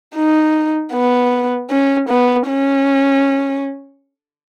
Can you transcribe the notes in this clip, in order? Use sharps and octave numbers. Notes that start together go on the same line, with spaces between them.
D#4
B3
C#4
B3
C#4